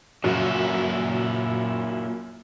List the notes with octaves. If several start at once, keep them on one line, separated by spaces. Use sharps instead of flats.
F#2 A#2 E4 F#4